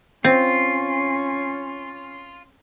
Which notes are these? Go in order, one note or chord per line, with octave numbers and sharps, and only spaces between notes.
C4 C#4 F4